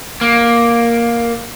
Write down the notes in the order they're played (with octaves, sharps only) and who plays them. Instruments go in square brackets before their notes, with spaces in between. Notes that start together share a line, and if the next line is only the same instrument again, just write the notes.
[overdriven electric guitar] A#3